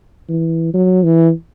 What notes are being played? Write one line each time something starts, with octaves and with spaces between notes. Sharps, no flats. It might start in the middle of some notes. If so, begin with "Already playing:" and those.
E3
F#3
E3